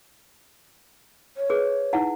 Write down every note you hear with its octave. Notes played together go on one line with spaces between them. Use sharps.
C#5
G#4 B4
D#4 E4 F#5